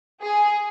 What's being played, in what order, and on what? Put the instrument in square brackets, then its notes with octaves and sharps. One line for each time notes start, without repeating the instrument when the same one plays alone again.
[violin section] G#4